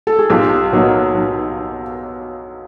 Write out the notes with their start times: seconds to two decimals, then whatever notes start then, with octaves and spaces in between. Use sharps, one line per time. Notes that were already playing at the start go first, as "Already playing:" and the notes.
0.07 A4
0.19 G#4
0.30 B1 F4 G4
0.72 B2 F#3 A#3 D#4
1.14 B1